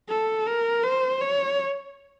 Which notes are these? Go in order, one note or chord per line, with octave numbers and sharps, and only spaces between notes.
A4
A#4
C5
C#5